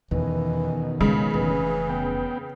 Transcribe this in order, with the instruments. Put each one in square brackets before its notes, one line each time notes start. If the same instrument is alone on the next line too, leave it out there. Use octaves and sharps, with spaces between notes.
[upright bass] E2 [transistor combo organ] B2 D#3 [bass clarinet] E3
[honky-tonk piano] C#3 [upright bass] F3 G#3
[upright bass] F1 [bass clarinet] E3
[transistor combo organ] B3 G5